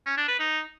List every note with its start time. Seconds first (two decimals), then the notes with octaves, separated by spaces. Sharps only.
0.06 C#4
0.17 D4
0.28 B4
0.40 D#4